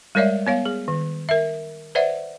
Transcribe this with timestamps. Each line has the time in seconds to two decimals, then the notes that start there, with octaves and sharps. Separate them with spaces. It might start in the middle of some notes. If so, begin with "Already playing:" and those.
0.15 G3 G#3 A#4 C#5 D5 E5
0.47 B3 C#5 F5
0.66 G#4
0.88 D#3
1.29 A#4 E5
1.95 B4 C5 D5 E5 F#5